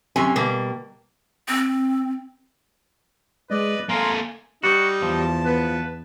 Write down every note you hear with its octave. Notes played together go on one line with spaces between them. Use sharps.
F#2 C3 C#4 G#5
B2 G3 A#3
C4
G#3 B4 D5 D#5
A#3 A4 F5 G#5 A#5 C6
G3 D#4 F#4
E2 F3 A5
B3 B4